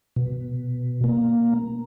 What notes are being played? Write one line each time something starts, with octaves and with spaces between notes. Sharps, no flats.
B2
A#3